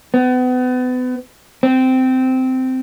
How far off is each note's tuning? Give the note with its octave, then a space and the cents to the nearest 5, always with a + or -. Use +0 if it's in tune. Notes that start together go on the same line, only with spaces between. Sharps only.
B3 +35
C4 -15